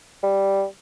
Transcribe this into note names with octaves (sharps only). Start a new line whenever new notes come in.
G3